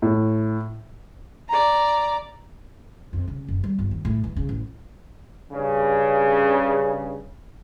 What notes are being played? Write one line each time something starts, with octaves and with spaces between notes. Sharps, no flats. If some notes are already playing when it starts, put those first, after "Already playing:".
A2
D5 A#5
F2
C#3
F#1
G3
G1
D#2
A2
E3
C#3
A1
G2 C#3